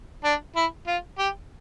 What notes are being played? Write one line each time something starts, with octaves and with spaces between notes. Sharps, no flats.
D4
E4
F4
G4